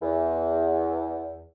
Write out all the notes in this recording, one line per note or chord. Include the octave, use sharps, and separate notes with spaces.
E2